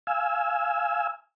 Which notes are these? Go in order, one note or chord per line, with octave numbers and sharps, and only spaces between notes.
F5 G#5 E6